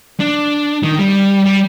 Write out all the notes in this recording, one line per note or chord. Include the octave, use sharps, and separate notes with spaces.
D4
D#3
G3
G3